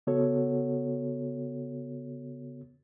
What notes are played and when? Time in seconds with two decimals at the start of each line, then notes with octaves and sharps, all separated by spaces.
0.07 C#3 B3 F#4 A4 C#5